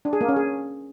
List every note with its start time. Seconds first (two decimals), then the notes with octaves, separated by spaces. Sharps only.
0.05 D4
0.13 G#4
0.21 A#3
0.29 C#4
0.36 G#4